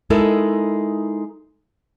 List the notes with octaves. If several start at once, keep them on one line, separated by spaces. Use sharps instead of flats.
G#3 D#4 E4 A4 A#4